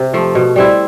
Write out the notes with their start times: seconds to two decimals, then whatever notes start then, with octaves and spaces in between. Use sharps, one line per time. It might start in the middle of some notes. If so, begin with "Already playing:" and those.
Already playing: C3
0.14 F3 A3
0.35 B2
0.56 G3 C4 E4